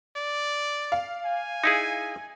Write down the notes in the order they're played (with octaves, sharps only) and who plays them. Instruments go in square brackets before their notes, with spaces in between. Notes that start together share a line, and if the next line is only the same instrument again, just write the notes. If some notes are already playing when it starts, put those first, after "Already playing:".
[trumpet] D5
[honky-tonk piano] F5
[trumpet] G#5
[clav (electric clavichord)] D#4 E4 G#4